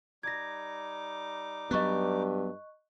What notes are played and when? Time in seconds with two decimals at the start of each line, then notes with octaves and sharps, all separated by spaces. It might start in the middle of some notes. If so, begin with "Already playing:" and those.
0.23 G3 D#4 D6 G#6 A#6
1.71 G2 F#3 B3 D#5 C#6 F#6